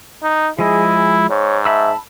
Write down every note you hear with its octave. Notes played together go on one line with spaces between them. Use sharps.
D#4
F3 G#3 E4 G#4 D#5
G#4
G#2 C#5
E5 A5 B5 E6